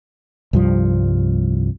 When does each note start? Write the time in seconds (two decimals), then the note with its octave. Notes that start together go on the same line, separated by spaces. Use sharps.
0.53 C2 G2 F3